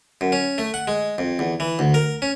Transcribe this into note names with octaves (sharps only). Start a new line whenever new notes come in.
F#2
C#4
A3
F#5
G#3
F2
E2
E3
D2
A#4
C#4